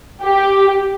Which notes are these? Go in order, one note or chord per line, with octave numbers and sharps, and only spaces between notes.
G4